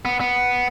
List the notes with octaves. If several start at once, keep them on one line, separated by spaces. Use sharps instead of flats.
B3
B3